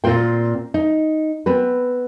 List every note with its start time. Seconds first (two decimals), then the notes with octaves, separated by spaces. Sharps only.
0.04 A#2 C4 F4 C5 G5
0.74 D#4
1.46 B3 C4 B4